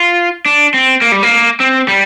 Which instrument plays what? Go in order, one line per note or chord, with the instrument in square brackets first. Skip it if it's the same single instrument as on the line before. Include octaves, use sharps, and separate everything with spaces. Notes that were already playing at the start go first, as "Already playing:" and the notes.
Already playing: [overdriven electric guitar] F4
D4
C4
A#3
G3
A#3
C4
G3